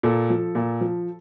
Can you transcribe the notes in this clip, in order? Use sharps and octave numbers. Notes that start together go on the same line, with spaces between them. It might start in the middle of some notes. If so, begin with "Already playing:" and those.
A#2 A4
F3
A#2
F3